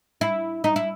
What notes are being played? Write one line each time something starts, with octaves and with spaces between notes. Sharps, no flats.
E4
D#4
E4